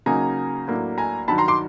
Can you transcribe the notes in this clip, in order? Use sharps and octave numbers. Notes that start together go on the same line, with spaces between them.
C#3 F#3 A#3 D#4 G#5 A#5
A2 F#3 A#3 D4
G#5 A#5
G2 D#3 F#3 A5 B5
A#5 C6
C6 D6